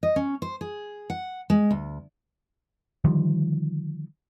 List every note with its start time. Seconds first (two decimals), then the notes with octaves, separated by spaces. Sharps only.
0.03 D#5
0.16 C#4
0.42 C5
0.61 G#4
1.10 F#5
1.50 G#3
1.71 D2
3.04 D3 D#3 F3 G3